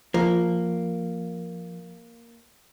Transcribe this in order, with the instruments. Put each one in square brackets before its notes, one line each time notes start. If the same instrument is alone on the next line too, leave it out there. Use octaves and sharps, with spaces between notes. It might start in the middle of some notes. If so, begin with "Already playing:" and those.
[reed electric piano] F3 [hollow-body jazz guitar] A#3